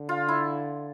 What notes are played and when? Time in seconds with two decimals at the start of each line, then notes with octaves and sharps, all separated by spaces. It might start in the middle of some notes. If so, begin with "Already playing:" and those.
Already playing: D3
0.09 F4
0.28 E4